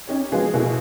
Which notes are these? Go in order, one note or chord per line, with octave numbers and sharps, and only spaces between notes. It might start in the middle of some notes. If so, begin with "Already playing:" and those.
C#4 D#4 G4 C#5
F3 G#3 A#3 B3 F#4 G#4
B2 A#3 E4 F#4 G#4 A4